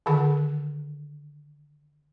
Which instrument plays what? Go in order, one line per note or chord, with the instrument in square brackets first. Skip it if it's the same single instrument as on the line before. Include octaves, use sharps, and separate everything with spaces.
[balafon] D3 D#3 G#4 F#5